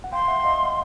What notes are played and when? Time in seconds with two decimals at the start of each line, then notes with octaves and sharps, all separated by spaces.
0.04 F#5
0.13 F5 G5 C6
0.28 E5 F#5
0.44 D#5 F5